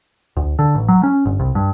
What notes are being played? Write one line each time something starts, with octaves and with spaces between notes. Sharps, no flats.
D2
D3
A1
F#3
C#4
G1
C2
G2